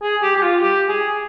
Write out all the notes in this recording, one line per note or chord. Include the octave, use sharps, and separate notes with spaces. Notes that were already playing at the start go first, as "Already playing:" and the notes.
G#4
G4
G4
F4
G4
G#4